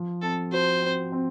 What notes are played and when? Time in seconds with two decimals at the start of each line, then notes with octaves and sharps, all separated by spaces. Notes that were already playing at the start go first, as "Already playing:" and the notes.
Already playing: F3
0.22 C4 A4
0.52 F#4 C5
0.83 C4
1.12 C4